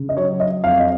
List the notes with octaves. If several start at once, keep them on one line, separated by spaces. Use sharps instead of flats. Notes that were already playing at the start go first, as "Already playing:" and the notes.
Already playing: C#3
D#5
F#3 C#5
D#5
F2 F5
D#5